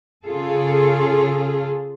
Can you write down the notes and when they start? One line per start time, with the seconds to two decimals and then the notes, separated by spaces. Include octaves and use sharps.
0.25 C#3 F4 G#4 A4